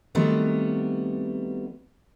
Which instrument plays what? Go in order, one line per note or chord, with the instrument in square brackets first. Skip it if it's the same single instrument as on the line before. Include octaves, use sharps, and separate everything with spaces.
[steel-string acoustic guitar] D#3 F#3 G3 A3 B3 C4